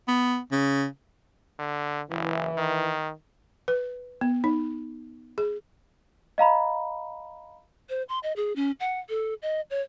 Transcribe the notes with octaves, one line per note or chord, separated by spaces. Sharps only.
B3
C#3
D3
F#1 E3
D#3
B4
B3
D#4
G#4
D#5 F5 A#5 B5
C5
C6
D#5
G#4
C#4
F#5
A4
D#5
C#5